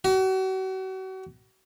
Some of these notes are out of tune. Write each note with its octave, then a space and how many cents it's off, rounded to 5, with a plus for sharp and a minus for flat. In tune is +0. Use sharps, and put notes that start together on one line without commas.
F#4 +40